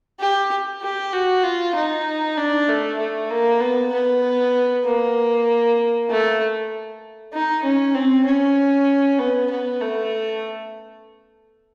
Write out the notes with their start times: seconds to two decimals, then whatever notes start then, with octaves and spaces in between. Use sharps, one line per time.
0.20 G4
0.82 G4
1.13 F#4
1.44 F4
1.75 D#4
2.37 D4
2.68 A3
2.98 A3
3.31 A#3
3.60 B3
3.92 B3
4.85 A#3
6.09 A3
7.33 D#4
7.64 C#4
7.95 C4
8.26 C#4
9.19 B3
9.50 B3
9.81 A3